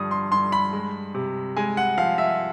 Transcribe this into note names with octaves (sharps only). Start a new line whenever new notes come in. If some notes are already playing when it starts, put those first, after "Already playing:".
Already playing: G2 D3 F3 D#6
C6
G2 C6
B5
G#3
C3
G#3 G#5
F#5
F3 F5
E5